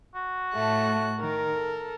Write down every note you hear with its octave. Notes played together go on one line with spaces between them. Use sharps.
F#4
A2 A3 A5 F#6
D#3 A#4
A4